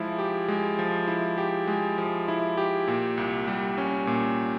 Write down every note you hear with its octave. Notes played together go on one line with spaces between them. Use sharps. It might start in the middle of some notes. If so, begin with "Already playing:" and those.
Already playing: F3 G#3 E4
G4
G#3
F3
E4
G4
G#3
F3
E4
G4
A#2
C2
G3
C#4
A#2